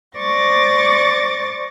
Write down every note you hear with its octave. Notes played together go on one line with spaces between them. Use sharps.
C5 D5 C#6 D6 A6 A#6